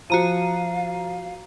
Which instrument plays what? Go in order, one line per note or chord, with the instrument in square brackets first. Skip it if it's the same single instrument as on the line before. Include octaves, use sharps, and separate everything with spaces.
[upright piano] F3 [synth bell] F#4 A#5 D#7 [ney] F5